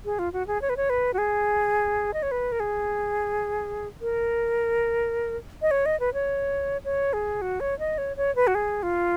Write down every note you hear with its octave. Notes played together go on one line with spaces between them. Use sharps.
G#4
F4
F#4
G#4
C#5
B4
C#5
B4
F#4
G#4
D#5
C#5
B4
A#4
G#4
A#4
D#5
C#5
D#5
B4
C#5
C#5
G#4
F#4
C#5
D#5
C#5
C#5
B4
F#4
G#4
F4